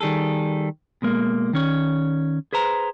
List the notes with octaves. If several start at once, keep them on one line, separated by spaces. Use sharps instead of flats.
D#3 G3 G#4 A4
B2 G#3 A#3
D#3 C#4 C#5
G#4 B4 C5 A#5